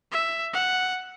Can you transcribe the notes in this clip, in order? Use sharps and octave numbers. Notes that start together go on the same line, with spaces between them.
E5
F#5